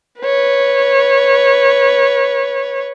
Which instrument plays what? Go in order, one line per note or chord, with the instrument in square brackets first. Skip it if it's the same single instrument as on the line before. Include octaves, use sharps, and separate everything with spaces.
[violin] B4 C#5